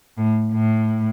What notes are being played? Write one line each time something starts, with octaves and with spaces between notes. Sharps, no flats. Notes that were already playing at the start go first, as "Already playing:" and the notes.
A2
A2